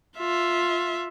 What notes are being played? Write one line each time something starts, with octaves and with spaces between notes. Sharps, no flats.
F4 E5